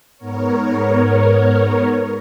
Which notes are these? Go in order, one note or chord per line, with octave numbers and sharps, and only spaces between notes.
G#2 B3 A#4 C#5